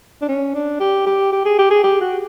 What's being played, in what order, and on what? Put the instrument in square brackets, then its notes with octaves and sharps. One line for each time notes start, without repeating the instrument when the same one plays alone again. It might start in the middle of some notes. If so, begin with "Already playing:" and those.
[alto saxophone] D4
C#4
D4
G4
G4
G4
G#4
G4
G#4
G4
F#4